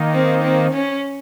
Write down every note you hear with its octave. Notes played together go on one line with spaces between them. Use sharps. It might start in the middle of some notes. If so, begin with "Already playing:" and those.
Already playing: D#3 A#3 D#4
C4
C4
C#4